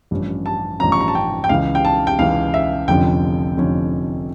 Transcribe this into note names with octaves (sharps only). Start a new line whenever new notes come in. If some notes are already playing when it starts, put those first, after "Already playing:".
A1 G2 F3 C#4
A5
A1 G2 F3 C#4 A#5
C#6
A#5
A5
G5
G5
C#2 C#3 E3 F5
G5
A5
G5
C#2 C#3 E3 F5
E5
F1 F2 D3 F3 C#4 G5
F1 F2 D3 F3 C#4